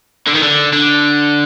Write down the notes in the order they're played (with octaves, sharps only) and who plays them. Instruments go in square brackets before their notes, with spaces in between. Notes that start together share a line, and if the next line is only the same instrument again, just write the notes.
[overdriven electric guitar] D3
D#3
D3
D3